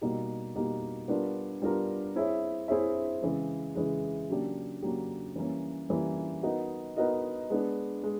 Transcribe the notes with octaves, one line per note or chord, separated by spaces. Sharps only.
B2 G3 A#3 D#4 G4
B2 G3 A#3 D#4 G4
G3 B3 D4 F4 A#4
G3 B3 D4 F4 A#4
C4 E4 G#4 C#5 E5
C4 E4 G#4 C#5 E5
C#3 E3 G#3
C#3 E3 G#3
C#3 F#3 A#3 D4 G4
C#3 F#3 A#3 D4 G4
E3 G3 A#3 C#4
E3 G3 A#3 C#4
B3 D#4 F#4 A#4 D#5
B3 D#4 F#4 A#4 D#5
G#3 B3 D4
G#3